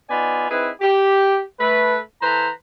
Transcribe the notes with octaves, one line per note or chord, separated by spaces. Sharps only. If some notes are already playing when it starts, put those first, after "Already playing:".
B3 D#4 F4 B4 D5 G#5
C4 D#4 E4 G#4 B4
G4
A3 B4
E3 A4 B4 C5 A#5